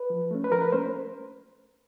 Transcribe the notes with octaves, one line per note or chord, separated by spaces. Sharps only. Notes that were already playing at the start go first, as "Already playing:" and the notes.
Already playing: B4
F3
A3 C#4
B4
F3 A#4
B4
A3 C#4 C5